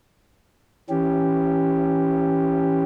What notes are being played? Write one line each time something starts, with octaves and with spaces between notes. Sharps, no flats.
E3 C#4 G4